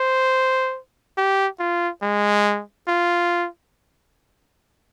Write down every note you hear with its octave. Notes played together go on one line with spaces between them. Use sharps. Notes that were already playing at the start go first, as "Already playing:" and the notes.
Already playing: C5
G4
F4
G#3
F4